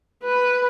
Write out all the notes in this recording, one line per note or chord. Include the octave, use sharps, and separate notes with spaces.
B4